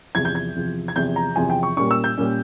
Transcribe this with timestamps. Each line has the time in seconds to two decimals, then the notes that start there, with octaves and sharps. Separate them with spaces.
0.15 E2 C3 F3 G#6
0.25 G6
0.35 G#6
0.55 E2 C3 F3
0.88 G#6
0.96 E2 C3 F3 G6
1.16 A#5
1.36 E2 C3 F3 G#5
1.50 G5
1.63 C#6
1.77 A#2 G3 A#3 C#4 C#6
1.91 E6
2.04 G6
2.18 A#2 G3 A#3 C#4